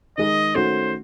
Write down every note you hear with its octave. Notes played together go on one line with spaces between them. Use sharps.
D#3 G#3 D#4 D#5
D#3 A3 C#4 F#4 C5